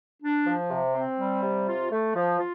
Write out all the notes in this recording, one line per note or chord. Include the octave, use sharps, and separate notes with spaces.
D4
F3
C3
C4
G3
C3
F4
A3
F3
F4